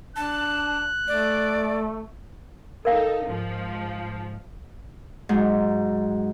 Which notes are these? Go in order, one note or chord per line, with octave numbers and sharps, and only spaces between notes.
D4 A5 F#6
A3 D5
D#4 A4 A#4 F5 G5
G#2 F3
G#2 F#3